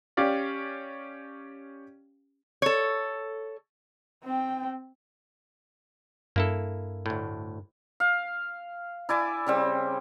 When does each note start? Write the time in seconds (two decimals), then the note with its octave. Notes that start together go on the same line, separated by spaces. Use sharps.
0.17 C#4 G4 D5 F5
2.62 A4 C#5
4.24 C4 G5
6.36 G2 A#3 E4 A4
7.06 D2 A2
8.00 F5
9.09 E4 D5 G#5 D6
9.47 C#3 G3 C4